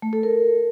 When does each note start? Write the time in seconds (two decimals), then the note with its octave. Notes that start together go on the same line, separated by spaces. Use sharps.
0.02 A3
0.13 A4
0.23 A#4